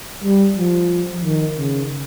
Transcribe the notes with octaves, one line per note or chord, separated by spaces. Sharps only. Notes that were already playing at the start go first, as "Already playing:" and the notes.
G3
F3
D#3
C#3